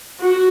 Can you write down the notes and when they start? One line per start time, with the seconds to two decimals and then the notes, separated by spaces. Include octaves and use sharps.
0.20 F#4